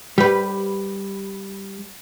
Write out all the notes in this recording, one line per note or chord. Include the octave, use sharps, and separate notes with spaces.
G3 G4 B4